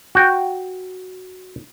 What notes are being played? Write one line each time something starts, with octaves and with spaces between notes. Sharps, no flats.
F#4 G5